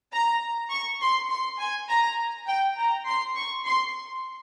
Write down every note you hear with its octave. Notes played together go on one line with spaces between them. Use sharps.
A#5
C#6
C6
C6
G#5
A#5
G5
A#5
C6
C#6
C6